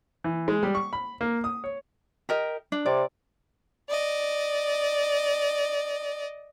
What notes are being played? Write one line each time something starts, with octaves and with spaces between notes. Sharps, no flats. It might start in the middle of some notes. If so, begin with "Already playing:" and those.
E3
G#3
G3
C#6
B5
A#3
D#6
C#5
G4 A#4 D#5
D4
C3 D5
D5 D#5